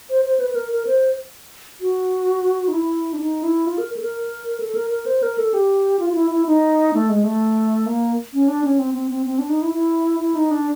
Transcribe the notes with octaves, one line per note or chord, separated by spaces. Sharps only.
C5
C5
B4
B4
A#4
A#4
C5
F#4
D#4
E4
D4
D#4
E4
F4
A#4
A4
A#4
A4
A#4
A#4
C5
A#4
A4
G4
F4
F4
E4
E4
D#4
A3
G#3
A3
A#3
C#4
D4
C#4
C4
C4
C4
C4
D4
D#4
E4
E4
E4
D#4
D4